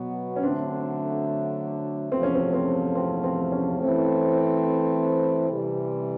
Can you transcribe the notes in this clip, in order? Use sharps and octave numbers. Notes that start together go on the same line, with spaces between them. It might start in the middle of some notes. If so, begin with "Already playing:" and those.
Already playing: B2 F#3 B3
C#4
D3 F#3 A3 C4 D4
E2 C3 F3 A3 C4
C#4
C4
C4
C4
C4
C#4
E3 A3 C4
C3 E3 G3